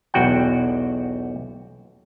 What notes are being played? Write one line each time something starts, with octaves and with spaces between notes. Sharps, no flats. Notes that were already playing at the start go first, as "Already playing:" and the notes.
B1 E2 F#4 F#5 G5